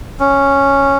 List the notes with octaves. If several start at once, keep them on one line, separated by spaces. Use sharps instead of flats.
C#4